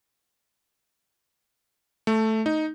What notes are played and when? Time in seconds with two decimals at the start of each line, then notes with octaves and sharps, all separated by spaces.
2.07 A3
2.46 D#4